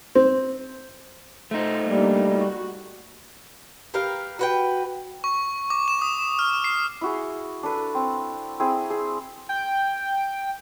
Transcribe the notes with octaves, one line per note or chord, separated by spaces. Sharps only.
C4
A3 D#4 C5
G3 A#3 D4
F#4
G4 A#4 B4 F5
F#4 B4 G5
C#6
D6
E7
D#6
F6
C7
E4 F#4 G#4
D4 A4 B4
C4
C4 E4 G#4
G#4
G5